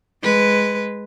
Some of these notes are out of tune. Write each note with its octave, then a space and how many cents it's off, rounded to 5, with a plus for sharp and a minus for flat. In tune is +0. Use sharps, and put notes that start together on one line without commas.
G#3 +0 B4 +0